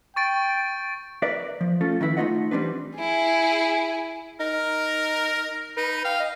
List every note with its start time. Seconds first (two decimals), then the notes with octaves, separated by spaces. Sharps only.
0.16 G5 C#6 A6 D7
1.22 A#4 B4 D5 E5
1.61 F3
1.81 A3 C#4 F4 A4
2.01 D#3 E3 E4 B4
2.17 A3 A#3 D#4 F4 D#5 F#5
2.51 E3 G3 C4 D4 B4
2.97 E4 G#4
4.40 D#4 A#4
5.77 D#4 B4
6.05 F5 G5
6.20 D#5